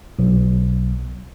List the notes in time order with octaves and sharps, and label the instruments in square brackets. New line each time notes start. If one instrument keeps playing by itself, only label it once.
[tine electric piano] B1